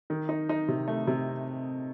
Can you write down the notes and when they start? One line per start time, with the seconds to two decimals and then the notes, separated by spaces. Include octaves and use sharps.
0.10 D#3
0.29 D#4
0.49 D#4
0.68 C3
0.88 A3
1.07 C3